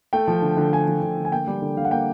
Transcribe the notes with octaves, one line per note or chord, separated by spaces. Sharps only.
A3 G5
F3
D3
D3
A3 G#5
F3
D3
D3
G#5
A#3 G5
G3
D3
D3 F5
F#5
A#3 G5